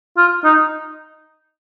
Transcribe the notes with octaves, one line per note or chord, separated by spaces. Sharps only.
F4
D#4